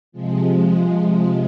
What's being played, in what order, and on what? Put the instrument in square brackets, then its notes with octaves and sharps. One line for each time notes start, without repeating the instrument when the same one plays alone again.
[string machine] C3 F3 G#3